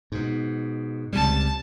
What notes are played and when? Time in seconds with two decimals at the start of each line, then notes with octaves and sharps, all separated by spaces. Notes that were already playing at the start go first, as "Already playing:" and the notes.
0.12 G#2 B2
1.13 C#2 C3 G3 A5